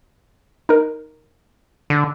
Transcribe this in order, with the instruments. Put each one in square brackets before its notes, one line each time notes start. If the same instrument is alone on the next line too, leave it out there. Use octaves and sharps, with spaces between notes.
[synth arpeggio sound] D#4 A#4
[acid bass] D3